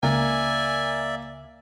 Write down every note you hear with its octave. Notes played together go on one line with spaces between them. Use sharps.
C#2 A#3 D5 E5 G#5